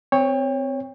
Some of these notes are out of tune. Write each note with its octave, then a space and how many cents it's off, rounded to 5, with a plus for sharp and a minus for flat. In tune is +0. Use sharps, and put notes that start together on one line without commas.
C4 -20 C#5 +0 G5 +30